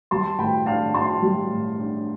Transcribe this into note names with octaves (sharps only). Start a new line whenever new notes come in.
G3 A5 C6
A2 G5 B5
D4 F5 A5
A2 A5 C6
G3
A2
D4